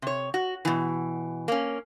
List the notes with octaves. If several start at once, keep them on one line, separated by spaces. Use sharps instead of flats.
C3 C#5
F#4
B2 E3
A#3 C#4